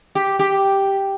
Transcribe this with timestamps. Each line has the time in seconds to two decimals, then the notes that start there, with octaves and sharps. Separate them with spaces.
0.15 G4
0.39 G4